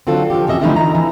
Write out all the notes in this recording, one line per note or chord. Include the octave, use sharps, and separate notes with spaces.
D3 F#3 C4 F4 A4
F3 G4
F2 C3 C#4 D#5 E5
D3 E3 F3 A3 D#4 E4
A#5
E3